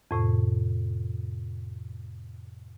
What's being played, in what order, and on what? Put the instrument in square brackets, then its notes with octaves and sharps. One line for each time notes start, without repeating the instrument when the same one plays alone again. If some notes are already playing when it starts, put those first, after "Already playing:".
[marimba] F2 A2 C3